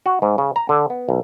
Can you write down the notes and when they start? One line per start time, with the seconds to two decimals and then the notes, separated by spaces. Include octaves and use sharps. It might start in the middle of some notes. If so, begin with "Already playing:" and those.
0.06 F#4
0.22 G#2
0.38 C#3
0.56 A#5
0.69 D3
0.90 B3
1.09 B1